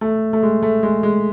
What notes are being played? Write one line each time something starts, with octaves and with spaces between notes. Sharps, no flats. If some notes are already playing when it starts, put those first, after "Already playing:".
A3
A3
G#3
A3
G#3
G#3